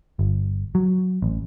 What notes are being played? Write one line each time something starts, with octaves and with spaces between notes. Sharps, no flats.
G1
F#3
A1